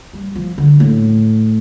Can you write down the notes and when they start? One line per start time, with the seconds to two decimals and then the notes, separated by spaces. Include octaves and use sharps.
0.13 G3
0.36 F3
0.58 D3
0.80 A2